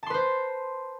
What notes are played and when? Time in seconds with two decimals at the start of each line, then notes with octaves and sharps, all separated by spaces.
0.03 A5
0.06 C6
0.10 B4
0.14 C5